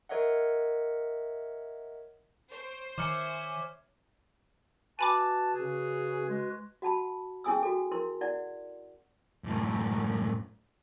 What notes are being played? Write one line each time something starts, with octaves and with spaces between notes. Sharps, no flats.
A#4 C#5 D#5 E5 F#5
C5 C#5 D7
D#3 C#5 E5 G#5 D6 F6 C#7
F#4 B4 G#5 A5 B5 D6
C#3 G#4
G#3
F#4 F#5 A5 B5
C#4 E4 G#4 G#5 D#6 E6
F#4 A4
E4 A#4 C6
E4 D5 F#5
F#2 A2